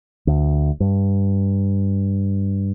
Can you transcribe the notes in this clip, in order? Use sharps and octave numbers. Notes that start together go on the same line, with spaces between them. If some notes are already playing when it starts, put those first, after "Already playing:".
D2
G2